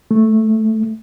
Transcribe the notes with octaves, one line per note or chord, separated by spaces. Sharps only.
A3